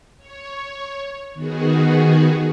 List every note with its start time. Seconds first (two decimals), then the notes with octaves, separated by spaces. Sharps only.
0.18 C#5
1.34 D#3 B3 F#4 G#4